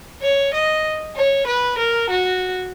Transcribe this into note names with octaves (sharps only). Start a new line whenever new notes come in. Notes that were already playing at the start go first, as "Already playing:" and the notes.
C#5
D#5
C#5
B4
A#4
F#4